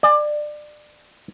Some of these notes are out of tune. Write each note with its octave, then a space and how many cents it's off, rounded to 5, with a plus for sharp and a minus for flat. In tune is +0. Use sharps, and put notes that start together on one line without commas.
D5 +25 G#5 +0